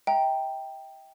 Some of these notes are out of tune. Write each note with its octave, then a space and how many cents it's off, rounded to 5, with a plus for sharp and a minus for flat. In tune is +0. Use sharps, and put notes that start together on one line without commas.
E5 -40 G5 +0 A#5 +0